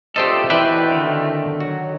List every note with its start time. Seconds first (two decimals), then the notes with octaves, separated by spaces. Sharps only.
0.16 G2 A3 C4 F4 G4 A4 C5 D#5
0.50 B2 E3 A3 C4 B4 D5 E5 G5
0.92 D3 D#3
1.60 F#3 F#4